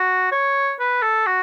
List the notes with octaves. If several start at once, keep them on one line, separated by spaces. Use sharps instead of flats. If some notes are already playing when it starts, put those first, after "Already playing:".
Already playing: F#4
C#5
B4
A4
F#4